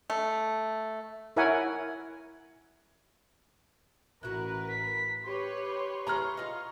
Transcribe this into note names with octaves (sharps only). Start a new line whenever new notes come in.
A3
E4 A#4 C#5 E5 F#5 G#5
A1 E4 F#4 A#4 B4 F#6
B6
G4 B4 C#5 C6
E4 G#4 B4 A#5 C#6 F6
F4 D#5